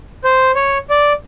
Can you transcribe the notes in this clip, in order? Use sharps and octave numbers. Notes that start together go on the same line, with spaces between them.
C5
C#5
D5